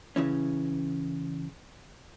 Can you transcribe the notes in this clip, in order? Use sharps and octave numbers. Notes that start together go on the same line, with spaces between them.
C#3 E3 C#4